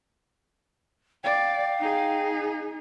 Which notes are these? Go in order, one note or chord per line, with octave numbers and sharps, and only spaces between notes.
D5 F5 G5
D#4 G#4